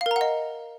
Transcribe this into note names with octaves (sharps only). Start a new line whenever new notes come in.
F5
A#4
A#5
F#5
D#5